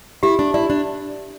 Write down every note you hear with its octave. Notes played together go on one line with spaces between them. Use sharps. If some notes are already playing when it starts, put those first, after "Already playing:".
E4 G4
D4
E4 D5
D4